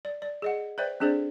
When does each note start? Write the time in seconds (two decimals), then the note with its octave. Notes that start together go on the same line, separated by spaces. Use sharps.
0.05 D5
0.22 D5
0.42 G#4 D#5 F#5
0.78 B4 C5 D5 E5 G5
1.00 C4 D4 G#4 A4 C5 D5